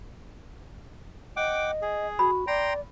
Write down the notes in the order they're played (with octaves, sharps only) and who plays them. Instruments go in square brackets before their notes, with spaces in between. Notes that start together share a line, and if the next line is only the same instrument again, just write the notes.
[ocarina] D#5 [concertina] F#5 G5 D6
[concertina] G#4
[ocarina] F#4 [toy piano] B5
[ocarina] D5 [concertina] G5 A#5 C6